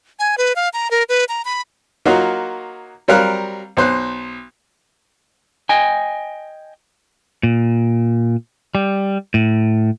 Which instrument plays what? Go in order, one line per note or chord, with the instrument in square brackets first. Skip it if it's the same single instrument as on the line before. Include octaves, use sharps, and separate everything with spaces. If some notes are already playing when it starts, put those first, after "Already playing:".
[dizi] G#5
B4
F5
A#5
A#4
B4
A#5
B5
[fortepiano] F#3 A#3 D#4 F4 F#4
F#3 G3 C4 A#4 F5 F#6
B1 C5 F#6
[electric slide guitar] D#5 G5 G#5
[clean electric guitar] A#2
G3
A2